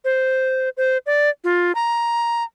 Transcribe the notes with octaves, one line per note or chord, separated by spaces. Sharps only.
C5
C5
D5
F4
A#5